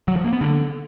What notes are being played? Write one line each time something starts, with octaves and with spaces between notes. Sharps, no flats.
F#3
F3
A#3
B3
D3